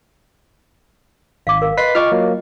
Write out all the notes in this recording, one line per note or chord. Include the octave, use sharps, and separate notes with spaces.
G#1 F5 D6
A#4 F5
B4 D#5 C6 B6 C7
F4 D#5 G5 C#6 D6 F6
F#3 A#3